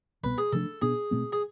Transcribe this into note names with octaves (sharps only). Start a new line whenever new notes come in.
C2 B2 B3 B4
G#4
C3 F3 A3 D4 A4
B2 B3 D4 G#4
B2 A3 C4
G#4